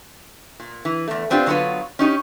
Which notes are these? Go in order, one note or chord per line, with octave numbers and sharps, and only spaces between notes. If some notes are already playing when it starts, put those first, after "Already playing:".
A#2
E3
E2 A3
B3 C4 D4 F4 G4
D3 F#3 B3 D4 F4 B4
C#4 D#4 F#4 G4